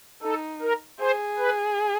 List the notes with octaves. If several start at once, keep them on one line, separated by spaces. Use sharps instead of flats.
D#4 A4
A#4
G#4 C5
B4